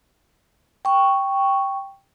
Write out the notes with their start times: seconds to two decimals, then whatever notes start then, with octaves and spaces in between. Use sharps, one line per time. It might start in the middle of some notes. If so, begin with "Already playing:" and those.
0.85 G5 C#6